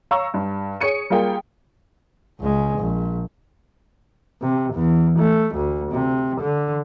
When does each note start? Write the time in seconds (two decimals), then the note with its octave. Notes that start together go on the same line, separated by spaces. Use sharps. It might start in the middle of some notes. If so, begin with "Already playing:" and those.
0.11 C#5 F5 A#5 C#6 E6
0.34 G2
0.80 G#4 C#5 C#7 D#7
1.10 G3 A#3 F4 G#4 G5
2.40 C#2 G#3
2.78 A#1
4.42 C3
4.74 E2
5.19 A3
5.55 D2
5.92 C3
6.41 D3